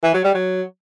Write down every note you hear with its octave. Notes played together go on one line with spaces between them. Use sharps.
E3
F#3
G3
F#3